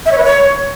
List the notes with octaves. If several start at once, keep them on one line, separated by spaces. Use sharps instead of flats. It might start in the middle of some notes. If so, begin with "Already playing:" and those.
E5
C#5
B4
C#5